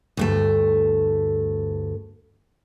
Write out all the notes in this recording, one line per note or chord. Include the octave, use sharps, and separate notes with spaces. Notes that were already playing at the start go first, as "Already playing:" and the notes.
D2 G2 A3